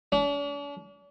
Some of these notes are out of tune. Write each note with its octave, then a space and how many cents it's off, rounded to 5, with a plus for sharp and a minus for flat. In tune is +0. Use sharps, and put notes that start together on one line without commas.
D4 -45